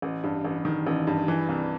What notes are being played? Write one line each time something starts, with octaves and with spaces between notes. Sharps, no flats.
A1
G2
A1
D#3
A1
G2
E3
C2